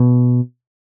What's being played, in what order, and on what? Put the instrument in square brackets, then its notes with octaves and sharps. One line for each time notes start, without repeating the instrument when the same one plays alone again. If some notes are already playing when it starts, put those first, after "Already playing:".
Already playing: [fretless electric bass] B2